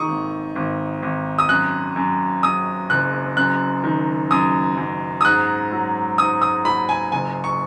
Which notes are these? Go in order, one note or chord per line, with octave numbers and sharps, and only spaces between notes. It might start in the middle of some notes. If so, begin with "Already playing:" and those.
Already playing: D#3 C#6 D#6
G#1
G#1
G#1
D#6
F#2 F#6
F#2
F#2 D#6
F#1 F#6
F#2 F#6
D#3
F#2 D#6
F#2
D#6
G#2 F#6
F#3
G#2 D#6
D#6
F#3 B5
G#5
F#1 G#5
C#6